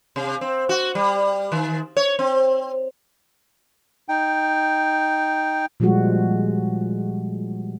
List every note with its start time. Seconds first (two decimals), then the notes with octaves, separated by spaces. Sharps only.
0.16 C3
0.41 C4
0.69 F#4
0.95 G3
1.52 D#3
1.97 C#5
2.19 C4
4.09 D#4 G5
5.80 A#2 F3 G3 G#3 F#4